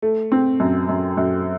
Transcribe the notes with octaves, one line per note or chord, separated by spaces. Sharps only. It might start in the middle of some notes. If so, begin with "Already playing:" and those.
A3
C4
F#2
F#2
F#2